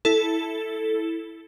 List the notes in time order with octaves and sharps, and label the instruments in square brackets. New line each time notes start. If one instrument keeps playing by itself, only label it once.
[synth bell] E4 A4